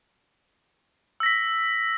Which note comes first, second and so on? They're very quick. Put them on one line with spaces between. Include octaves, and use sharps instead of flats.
E6 A#6 B6